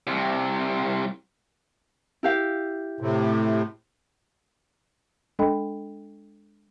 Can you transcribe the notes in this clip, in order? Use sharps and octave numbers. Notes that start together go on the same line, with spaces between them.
C2 C3
E4 G4 F5
A2 C3
G#3 D4 A4 D#5 G5 B5